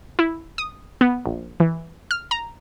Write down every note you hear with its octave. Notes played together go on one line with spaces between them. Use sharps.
E4
D#6
B3
A#1
E3
F6
A#5